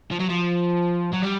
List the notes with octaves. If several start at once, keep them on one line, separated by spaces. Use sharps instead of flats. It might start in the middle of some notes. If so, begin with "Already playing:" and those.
F3
F#3
F3
F#3
G3